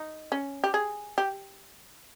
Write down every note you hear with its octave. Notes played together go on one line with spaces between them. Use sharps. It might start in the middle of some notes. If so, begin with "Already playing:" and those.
Already playing: D#4
C#4
G4
G#4
G4